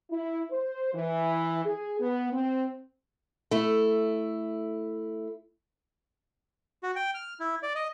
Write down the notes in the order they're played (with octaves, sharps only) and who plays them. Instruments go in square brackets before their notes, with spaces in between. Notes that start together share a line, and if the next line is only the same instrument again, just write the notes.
[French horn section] E4
C5
E3
G#4
B3
C4
[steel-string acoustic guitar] A3 E4
[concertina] F#4
G5
F6
E4
D5
D#5